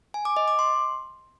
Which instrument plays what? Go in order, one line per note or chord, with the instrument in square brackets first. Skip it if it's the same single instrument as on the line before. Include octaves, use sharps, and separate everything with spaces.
[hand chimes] G#5
D6
D#5
D6
C6